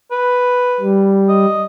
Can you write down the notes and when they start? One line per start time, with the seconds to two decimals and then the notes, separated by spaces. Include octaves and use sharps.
0.11 B4
0.80 G3
1.29 D#5